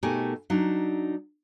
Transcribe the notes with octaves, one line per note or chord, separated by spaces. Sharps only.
B2 A3 D#4 G4 A#4 G#5
F#3 D4 D#4